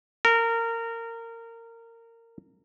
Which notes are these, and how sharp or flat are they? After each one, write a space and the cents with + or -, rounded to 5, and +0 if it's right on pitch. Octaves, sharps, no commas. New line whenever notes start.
A#4 -20